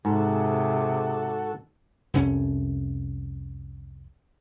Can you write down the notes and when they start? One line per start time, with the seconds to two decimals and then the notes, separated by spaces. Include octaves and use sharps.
0.05 G#2 C3 F#4 G#4 A4
2.14 C2 F2 C#4